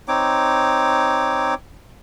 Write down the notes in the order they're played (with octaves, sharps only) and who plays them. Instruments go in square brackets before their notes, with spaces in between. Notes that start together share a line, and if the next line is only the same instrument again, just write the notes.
[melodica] C4 D#4 C#5 D6